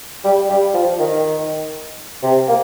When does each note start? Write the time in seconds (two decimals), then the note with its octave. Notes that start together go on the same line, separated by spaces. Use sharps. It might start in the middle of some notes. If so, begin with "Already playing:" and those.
0.24 G3
0.49 G3
0.74 F3
0.99 D#3
2.23 C3
2.48 A#3